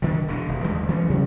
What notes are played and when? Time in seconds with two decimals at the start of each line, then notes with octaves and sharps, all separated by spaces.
0.02 D3 D#3 G3 D4
0.28 E1 B2 D3
0.48 D#1
0.64 D#2 D3 G#3 A3
0.89 E3 G3 A#3 C#4
1.10 C3 F#3 G#3